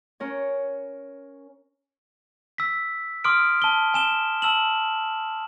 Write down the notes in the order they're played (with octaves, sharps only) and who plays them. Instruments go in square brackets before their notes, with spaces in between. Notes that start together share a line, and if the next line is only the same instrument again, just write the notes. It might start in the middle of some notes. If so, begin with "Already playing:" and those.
[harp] C#4 A#4 C#5
[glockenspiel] E6 B6
C6 D6 D#6 F6 D7
A5 G7
G#5 E7 G7
A5 E6 E7 F#7